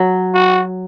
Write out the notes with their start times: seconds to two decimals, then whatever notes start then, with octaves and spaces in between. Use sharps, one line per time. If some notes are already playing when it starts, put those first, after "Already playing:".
Already playing: F#3
0.34 F#4